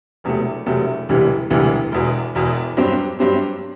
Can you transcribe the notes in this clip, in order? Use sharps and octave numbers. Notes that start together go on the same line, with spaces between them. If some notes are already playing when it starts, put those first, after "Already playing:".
E1 E2 C3 F#3 A3
E1 E2 C3 F#3 A3
E1 D2 C3 E3 G3
E1 D2 C3 E3 G3
E1 E2 B2
E1 E2 B2
G2 F#3 C4 G4
G2 F#3 C4 G4